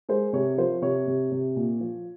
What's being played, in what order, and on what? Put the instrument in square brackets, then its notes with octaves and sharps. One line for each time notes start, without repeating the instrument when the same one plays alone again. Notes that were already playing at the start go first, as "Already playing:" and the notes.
[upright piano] G#3 C5
C3 C#5
F3 C5
C3 C#5
C3
C3
A#2
F3